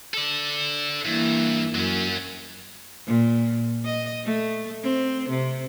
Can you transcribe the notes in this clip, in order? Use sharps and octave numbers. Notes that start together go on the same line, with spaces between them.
A4 D5
G2 E3 A#3
F#2 F#3 C#4
A#2
D#5
A3
C4
C3